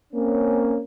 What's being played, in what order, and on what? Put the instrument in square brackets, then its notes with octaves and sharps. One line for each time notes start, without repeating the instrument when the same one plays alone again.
[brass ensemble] A#3 C4 C#4